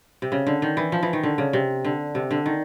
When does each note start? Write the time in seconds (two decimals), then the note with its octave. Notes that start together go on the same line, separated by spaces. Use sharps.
0.22 C3
0.32 C#3
0.47 D3
0.62 D#3
0.77 E3
0.92 F3
1.03 E3
1.13 D#3
1.23 D3
1.38 C#3
1.53 C3
1.85 D3
2.15 C3
2.31 D3
2.46 D#3